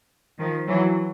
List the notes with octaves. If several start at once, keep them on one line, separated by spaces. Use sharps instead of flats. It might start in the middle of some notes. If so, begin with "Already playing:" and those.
D#3 F3
E3 F#3